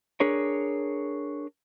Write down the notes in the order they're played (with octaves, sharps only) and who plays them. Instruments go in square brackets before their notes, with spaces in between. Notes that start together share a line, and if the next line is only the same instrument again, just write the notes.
[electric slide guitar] D4 G#4 A#4 C#5